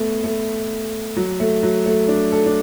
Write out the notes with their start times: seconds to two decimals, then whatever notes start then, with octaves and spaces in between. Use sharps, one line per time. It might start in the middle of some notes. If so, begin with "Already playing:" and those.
Already playing: A3 B3
0.24 A3
1.17 F#3
1.40 A3
1.63 F#3
1.86 A3
2.08 D4
2.32 A4
2.46 D4